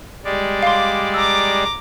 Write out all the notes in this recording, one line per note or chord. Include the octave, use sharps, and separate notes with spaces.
G3 G#3 D5
F5 C6 D6
A#5 D6 E6